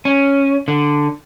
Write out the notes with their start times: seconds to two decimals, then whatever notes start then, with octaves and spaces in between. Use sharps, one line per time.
0.05 C#4
0.68 D3